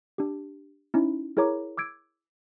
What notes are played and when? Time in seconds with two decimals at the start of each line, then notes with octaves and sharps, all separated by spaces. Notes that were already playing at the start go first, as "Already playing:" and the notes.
0.18 D4 G4
0.94 C#4 D#4 E4
1.37 E4 G#4 A#4 C#5 A#5 D6
1.77 D6 E6 G#6 D7